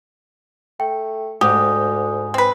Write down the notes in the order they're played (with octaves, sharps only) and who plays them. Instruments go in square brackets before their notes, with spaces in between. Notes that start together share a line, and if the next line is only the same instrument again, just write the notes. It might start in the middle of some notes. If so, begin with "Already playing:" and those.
[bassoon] A3 [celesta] G5
[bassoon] D2 [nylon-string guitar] G#2 [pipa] G4 [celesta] D#6
[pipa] C4 B4